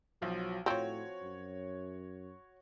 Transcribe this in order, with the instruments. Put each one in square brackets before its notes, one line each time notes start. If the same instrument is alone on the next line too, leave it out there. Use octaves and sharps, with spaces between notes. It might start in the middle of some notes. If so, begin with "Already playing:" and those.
[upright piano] B1 F3 [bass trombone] F#3
[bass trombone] A2 [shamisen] F3 C4 [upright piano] F#4 C#5
[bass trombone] F#2